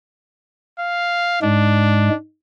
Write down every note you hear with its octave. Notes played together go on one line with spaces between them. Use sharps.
F5
G#2 G#3 D4